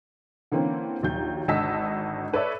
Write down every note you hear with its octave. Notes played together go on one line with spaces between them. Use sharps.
D3 E3 A#3 C4 C#4
A#1 D#2 F#3 G6
G#1 D3 D#5 A5 E6 B6
A4 B4 C#5 D5 E5 E6